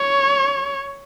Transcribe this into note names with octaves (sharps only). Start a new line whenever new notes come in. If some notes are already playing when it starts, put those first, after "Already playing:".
Already playing: C#5